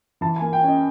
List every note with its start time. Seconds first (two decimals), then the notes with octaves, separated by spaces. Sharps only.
0.21 E3 A5
0.36 G#5
0.41 A#3
0.53 G5
0.63 C#4 D#5